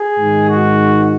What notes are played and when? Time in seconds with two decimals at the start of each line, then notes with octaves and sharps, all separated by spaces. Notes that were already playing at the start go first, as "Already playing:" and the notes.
Already playing: G#4
0.19 G#2 D#3 G#3
0.48 F#4